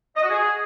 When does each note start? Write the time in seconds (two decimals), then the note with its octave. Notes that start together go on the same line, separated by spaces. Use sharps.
0.16 D#5
0.23 F#4
0.29 G#4